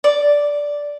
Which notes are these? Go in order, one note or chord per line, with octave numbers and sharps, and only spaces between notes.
D5